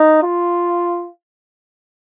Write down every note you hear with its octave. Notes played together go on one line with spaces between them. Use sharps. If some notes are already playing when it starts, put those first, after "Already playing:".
Already playing: D#4
F4